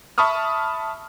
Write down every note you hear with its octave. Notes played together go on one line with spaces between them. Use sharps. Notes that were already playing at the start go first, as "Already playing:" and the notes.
E5 A5 B5 C#6 D#6 F6